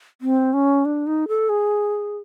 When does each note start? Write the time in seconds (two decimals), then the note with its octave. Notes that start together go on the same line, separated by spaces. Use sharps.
0.21 C4
0.53 C#4
0.85 D4
1.07 D#4
1.28 A4
1.49 G#4